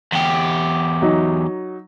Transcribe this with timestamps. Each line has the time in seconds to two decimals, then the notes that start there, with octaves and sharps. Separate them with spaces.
0.12 E2 G4
1.02 F#3 D#4